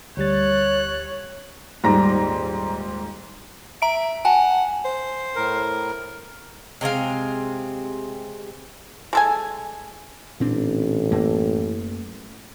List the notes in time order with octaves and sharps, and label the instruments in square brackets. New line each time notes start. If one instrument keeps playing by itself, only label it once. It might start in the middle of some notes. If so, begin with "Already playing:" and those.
[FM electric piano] D2 G3 A6 [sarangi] C#5 [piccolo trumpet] F#6
[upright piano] D#1 G#2 G3 A#5 A#6
[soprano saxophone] E5 [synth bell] A#5 D7
[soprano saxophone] F#5 [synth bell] G#5 A5
[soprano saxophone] C5
[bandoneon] A2 A#4
[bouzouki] C3 G#3 C4 F5
[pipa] G#3 A4 G#5
[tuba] A1 [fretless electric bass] A#2 C4 D4
[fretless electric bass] F#2 A3 A#3